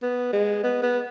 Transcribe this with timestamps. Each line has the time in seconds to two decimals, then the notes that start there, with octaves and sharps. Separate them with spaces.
0.02 B3
0.33 G#3
0.63 B3
0.83 B3